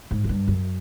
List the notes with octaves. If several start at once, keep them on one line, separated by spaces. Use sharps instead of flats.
G#2
F#2
G2
F#2